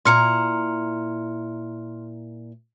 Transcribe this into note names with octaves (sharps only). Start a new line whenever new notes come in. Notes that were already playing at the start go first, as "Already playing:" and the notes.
A#2 E4 A#5 C6 F6 C#7